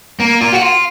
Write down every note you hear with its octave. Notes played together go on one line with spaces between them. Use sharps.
A#3
F4
F#4
F4